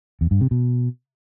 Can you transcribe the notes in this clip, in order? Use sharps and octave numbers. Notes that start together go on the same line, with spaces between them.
E2
G2
C3
B2